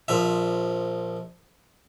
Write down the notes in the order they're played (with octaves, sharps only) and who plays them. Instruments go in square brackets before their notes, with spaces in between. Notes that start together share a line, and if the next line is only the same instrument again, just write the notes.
[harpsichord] A#1 F3 E5